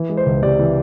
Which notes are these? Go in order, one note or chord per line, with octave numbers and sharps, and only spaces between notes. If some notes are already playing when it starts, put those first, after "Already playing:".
Already playing: E3
G#3
C5
C#2
C3 D5
E3